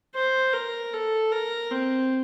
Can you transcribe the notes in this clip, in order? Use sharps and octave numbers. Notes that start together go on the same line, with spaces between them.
C5
A#4
A4
A#4
C4